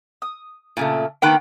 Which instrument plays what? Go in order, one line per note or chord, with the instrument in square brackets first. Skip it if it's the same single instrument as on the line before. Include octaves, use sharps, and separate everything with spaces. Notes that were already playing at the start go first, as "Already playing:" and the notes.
[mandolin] D#6
[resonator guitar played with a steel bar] A#2 C#3 A3
[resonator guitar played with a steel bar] D#3 A#3 B3 [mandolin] G5 B5 F#6